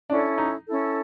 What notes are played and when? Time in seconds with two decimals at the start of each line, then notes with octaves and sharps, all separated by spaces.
0.10 C#4 D4 E4 A4
0.38 D#4
0.67 C#4 E4 A4